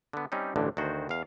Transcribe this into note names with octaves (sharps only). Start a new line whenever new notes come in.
D3 B3
G3 C4 C#4 D#4
A1 D2 G2 D3 E3
D2 D#3 F#4 C5
E2 F5